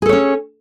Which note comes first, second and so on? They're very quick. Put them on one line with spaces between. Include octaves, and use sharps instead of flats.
G#4 A4 C#5 C#4